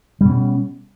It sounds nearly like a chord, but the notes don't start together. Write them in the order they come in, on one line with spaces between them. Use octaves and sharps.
G3 B2 C#4